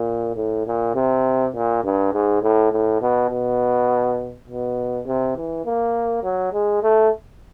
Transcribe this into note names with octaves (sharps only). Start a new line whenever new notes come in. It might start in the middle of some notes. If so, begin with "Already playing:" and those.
Already playing: A#2
A2
A#2
C3
A#2
G2
G#2
A2
A2
B2
B2
B2
C3
E3
A#3
F#3
G#3
A3